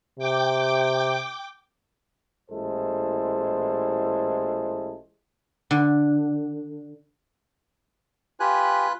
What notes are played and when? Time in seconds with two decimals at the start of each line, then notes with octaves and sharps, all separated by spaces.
0.19 C3 G5 D6
2.51 A1 A#2 G#3 E4 A4 C5
5.71 D3
8.40 F4 G4 B4 G#5 F#6